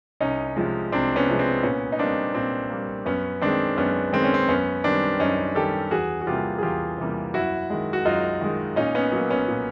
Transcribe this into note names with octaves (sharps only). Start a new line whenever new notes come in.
C2 C#4 D#4
C3 F3 G#3
C2 C4 D4
B3 C#4
C3 F3 G#3
C4
A#2 B3 C#4
D#4
G3 A#3 C4 D4
A#2 C4
G3 A#3
F#2 B3 C#4
D#3 G#3 C4 D4
F#2 B3 C#4
D#3 G#3 C4
C#4
C4
F#2 B3 C#4
D#3 G3 C4 D4
F#2 C#4 D#4
D#3 G3 G4 A4
E2 F#4 G#4
F#4
C3 E3 G3 A#3 F4 G4
G#4
E2 F4 G4
C3 E3 G3 A#3
F#2 E4 F#4
D#3 G#3
F#4
F#2 D#4 F4
D#3 G#3
A#2 C#4 D#4
B3 C#4
F#3 A#3
B3 C#4
A#2